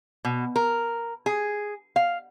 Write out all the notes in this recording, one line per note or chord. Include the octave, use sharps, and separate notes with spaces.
B2
A#4
G#4
F5